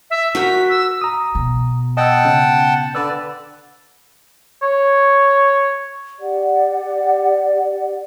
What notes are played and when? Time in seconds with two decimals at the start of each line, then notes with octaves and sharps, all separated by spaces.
0.10 E5
0.35 F#4 A#4 G5 B6
0.69 E6
1.01 A#5 D#6
1.35 B2
1.97 D#5 F#5 G5 A5 E6
2.25 C#3
2.95 D3 B4 D5 E6
4.62 C#5
6.20 G4 D5 F#5